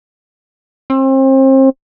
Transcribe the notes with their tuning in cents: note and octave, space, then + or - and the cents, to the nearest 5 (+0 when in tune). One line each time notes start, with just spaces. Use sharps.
C4 +35